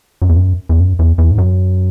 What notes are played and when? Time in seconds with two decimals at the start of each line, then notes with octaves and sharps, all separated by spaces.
0.22 F#2
0.29 E2
0.36 F#2
0.69 E2
0.80 F#2
0.99 E2
1.18 E2
1.31 G#2
1.38 F#2